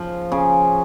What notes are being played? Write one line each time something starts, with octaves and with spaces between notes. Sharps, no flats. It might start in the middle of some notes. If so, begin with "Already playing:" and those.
Already playing: C#3 F3
C#3